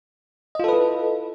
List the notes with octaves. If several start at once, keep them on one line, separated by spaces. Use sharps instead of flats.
E4 F4 A4 B4 D#5